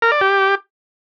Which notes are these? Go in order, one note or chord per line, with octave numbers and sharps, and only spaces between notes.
A#4
D5
G4